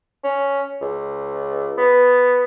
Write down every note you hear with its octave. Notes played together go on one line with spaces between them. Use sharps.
C#4
C#2
B3